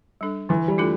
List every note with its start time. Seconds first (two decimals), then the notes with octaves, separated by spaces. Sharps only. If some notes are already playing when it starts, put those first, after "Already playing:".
0.21 G3 D4 A4
0.49 D3 E3
0.68 G3
0.78 A3 D4 F4 A4